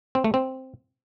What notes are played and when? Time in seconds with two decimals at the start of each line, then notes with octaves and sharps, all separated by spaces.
0.15 C4
0.24 A3
0.34 C4